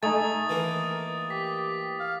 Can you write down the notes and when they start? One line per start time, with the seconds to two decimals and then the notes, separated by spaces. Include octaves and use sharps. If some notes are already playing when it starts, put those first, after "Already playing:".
0.03 A3 D#4 G#5 D#6 A6
0.49 E3 A#3 A#4
1.30 G4 B6
2.00 F5